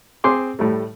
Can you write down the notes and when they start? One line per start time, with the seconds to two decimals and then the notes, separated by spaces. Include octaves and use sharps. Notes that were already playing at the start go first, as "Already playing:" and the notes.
0.24 C4 G#4 C6 D6
0.59 A2 G3 A3